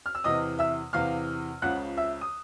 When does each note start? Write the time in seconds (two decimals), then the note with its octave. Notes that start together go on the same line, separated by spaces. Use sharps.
0.06 F6
0.15 E6
0.24 E2 C3 E3 D#5 D#6
0.59 E5 E6
0.93 E2 C3 E3 F5 F6
1.62 C#2 C#3 F3 F#5 F#6
1.97 E5 E6
2.21 D#6